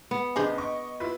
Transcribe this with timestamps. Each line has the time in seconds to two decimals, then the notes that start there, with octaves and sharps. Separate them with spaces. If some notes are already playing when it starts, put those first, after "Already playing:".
0.11 B3
0.36 C#2 D4 G#4 C5 D#5
0.58 D#5 C#6 D6
1.00 E4 F4 B4